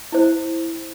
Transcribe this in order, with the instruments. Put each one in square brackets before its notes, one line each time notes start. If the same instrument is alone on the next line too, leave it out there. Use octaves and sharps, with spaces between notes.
[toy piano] E4 C5